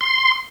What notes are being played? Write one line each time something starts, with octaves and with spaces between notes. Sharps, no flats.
C6